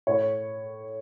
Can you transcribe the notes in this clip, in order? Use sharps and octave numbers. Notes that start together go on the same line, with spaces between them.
A2 C#5